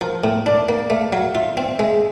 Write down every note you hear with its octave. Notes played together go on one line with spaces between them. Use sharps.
F3 A#4
A2
D4 D5
A#3
A3 F5
F#3 F5
F4 E5
C4
G#3 E5